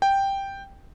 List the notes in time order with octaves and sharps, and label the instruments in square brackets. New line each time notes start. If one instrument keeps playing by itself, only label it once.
[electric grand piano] G5